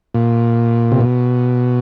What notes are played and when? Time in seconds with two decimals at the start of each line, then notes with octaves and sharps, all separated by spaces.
0.14 A#2
0.92 C3
1.01 B2